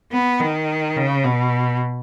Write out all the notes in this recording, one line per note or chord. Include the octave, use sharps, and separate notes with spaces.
B3
D#3
C#3
B2